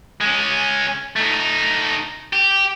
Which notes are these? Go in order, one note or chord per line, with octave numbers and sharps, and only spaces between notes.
G#3 C#4
A3 D#4
G4